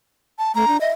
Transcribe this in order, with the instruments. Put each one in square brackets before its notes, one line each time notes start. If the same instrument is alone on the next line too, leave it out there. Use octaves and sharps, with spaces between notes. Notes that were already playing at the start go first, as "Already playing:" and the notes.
[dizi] A5
[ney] A3 [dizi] A#5
[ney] D4
[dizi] D#5 [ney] E5